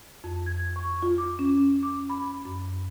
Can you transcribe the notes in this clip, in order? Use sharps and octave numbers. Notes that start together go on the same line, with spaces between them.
F2
G#6
C#6
F4
D6
C#4
D6
B5
F#2